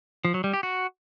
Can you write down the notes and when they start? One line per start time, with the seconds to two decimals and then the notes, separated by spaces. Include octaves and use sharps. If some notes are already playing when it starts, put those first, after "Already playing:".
0.25 F3
0.34 F#3
0.44 G3
0.53 G4
0.63 F#4